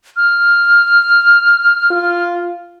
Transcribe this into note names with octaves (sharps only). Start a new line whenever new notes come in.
F6
F4